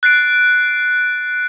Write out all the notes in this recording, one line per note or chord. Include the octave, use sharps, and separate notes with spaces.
F#6 A6 C7 D7